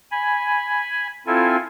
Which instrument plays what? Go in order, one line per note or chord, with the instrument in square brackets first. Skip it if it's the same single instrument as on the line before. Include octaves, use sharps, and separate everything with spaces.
[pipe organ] G#5 B5
C4 E4 F4 A4 G#5